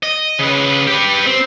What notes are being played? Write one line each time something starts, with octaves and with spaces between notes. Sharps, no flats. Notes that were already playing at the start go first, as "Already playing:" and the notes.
D#5
C#3 B4
G4 B4
C4